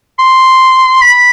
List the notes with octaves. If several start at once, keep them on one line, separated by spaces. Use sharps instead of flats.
C6
B5